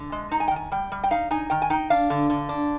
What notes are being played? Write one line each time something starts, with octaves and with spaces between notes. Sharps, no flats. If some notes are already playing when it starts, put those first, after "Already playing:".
Already playing: D3
G#3
D#4 A#5
G#5
G5
D#3
G#5
G3 G5
G3
G5
D#4 F5
D#4 G#5
D#3 G5
G#5
D#4 G5
D4 F5
D3
D3
D4